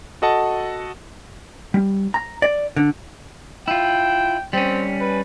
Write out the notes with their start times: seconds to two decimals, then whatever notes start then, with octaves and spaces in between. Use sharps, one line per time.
0.22 F#4 A4 D#5 F#5 A5
1.74 G3
2.14 A#5
2.42 D5
2.76 D3
3.68 E4 F4 G5
4.53 G3 C4 C#4
5.00 B4